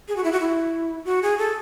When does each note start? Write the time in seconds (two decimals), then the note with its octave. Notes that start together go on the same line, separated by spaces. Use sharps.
0.08 G#4
0.16 F#4
0.24 E4
0.32 F#4
0.40 E4
1.05 F#4
1.22 G#4
1.38 A4